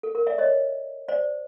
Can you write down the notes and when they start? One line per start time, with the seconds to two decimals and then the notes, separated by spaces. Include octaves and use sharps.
0.03 A4
0.15 A#4
0.27 D5 E5
0.38 C#5 D#5
1.08 C5 D5